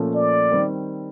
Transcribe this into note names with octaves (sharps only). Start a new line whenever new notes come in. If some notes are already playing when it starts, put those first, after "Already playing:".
Already playing: A#2 F3 A3 C#4
D5
D#3 G3 C4